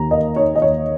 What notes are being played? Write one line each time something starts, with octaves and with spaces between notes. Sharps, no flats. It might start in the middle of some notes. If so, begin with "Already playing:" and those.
Already playing: D#2 D#4 A#5
A#3 D#5
D#4 C#5
D#5
D#2 C#5